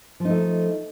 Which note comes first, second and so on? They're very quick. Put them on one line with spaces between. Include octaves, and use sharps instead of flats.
F3 D#4 A3